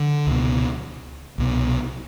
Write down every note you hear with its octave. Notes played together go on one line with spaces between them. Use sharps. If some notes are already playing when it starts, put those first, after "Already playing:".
Already playing: D3
C#2 B2
C2 B2